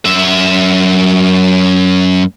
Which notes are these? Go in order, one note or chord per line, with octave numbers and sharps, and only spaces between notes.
F#2 E5